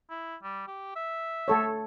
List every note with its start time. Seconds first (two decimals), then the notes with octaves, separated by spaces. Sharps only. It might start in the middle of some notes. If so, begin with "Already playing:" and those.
0.10 E4
0.43 G3
0.68 G4
0.96 E5
1.48 A3 A4 C#5